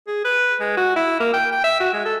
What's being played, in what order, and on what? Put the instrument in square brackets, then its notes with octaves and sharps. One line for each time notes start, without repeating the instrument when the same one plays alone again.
[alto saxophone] G#4
B4
G#3
F#4
E4
A#3
G5
G5
E5
F#4
G#3
A4